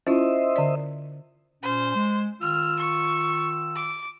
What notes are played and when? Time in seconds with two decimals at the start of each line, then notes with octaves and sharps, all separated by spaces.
0.07 C#4 E4 F4 C5 D#5 E5
0.56 D3 D5
1.63 A#2 C#4 C5
1.95 G#3
2.41 D#3 F4 E6 F6
2.79 C#6
3.76 D6